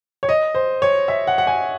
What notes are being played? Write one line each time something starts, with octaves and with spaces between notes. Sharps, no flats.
C#5
D#5
C5
C#5
E5
F#5
F#5
G#5